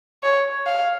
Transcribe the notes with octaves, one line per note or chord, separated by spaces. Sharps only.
C#5
F5